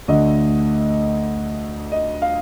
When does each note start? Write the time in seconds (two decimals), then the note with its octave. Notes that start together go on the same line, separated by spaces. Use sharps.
0.08 D2 D3 A3 D#5
1.92 D#5
2.22 F5